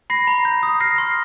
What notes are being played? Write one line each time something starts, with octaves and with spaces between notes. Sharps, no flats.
B5 A#6 C7
A#5
G6
D#6
F6 A#6 C7
C6